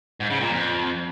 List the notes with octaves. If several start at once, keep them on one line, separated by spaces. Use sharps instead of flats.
G#2
C#3
A#2
F2